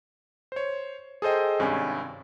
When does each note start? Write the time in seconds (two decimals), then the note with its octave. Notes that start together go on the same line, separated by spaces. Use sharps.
0.52 C5 C#5
1.22 G#4 A4 C5 D#5 G5
1.59 G#1 G2 C3 C#4 G#5